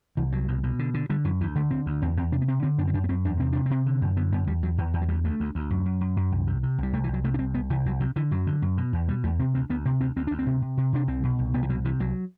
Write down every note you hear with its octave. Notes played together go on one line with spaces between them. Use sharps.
C2 E3
C2 F#3
B2
B2
D3
D3
D3 G3
F#2 E3
D2 E3
D3 A3
D3 C4
D2
E2 C4
E2 C4
C3 D4
B3
C3 C4
D3 C4
F#2 D4
C4
F#2 D4
B3
F#2 C4
E2 D4
C3 C4
C3 D4
C3 C4
D3
F#2
D3 B3
F#2 B3
E2 G3
E2 F#3
E2 E3
E2 E3
F#3
D2 G3
D2 A3
D2
D2
F#2
F#2
F#2
F#2
C2
C3
C3
C2 G3
C2 A3
E3
C2 F#3
C3 A3
D4
C2 C4
C2 B3
C2 E3
C2 F#3
C3 F#3
D3 E3
F#2 F#3
D3
F#2
B2
E2
B2 G3
E2 A3
C3 C4
D2 C4
D2 B3
C3 C4
D2 C4
D2 C4
D2 D4
C4
C3
C3
C3
C3 D4
C2 C4
B2
C2
C2 B3
E3
B2 F#3
C3 E3
C2 F#3